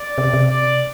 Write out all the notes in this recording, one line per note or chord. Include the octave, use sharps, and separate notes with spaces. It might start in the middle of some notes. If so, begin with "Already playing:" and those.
Already playing: D5
C3
C3
D5